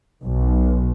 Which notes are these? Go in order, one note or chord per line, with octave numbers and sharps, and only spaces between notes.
B1